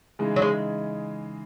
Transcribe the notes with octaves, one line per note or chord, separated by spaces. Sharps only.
C#3 E3 G#3 D#4
F#3
G#3